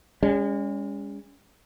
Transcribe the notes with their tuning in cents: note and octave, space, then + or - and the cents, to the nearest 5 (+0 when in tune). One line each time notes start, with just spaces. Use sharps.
G#3 -35 C#4 +25